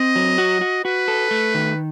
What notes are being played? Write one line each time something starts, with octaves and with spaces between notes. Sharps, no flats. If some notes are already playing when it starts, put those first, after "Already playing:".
Already playing: C4 D#5
F#3
F#4
F#4
F#4 B4
A4
A3
D#3